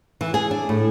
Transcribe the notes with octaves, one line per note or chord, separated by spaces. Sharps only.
E3
G#4
D4
A2